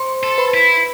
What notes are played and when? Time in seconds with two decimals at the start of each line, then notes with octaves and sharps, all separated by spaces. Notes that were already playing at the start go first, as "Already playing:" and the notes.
Already playing: C5 C6
0.23 A4
0.38 B4 B5
0.54 E4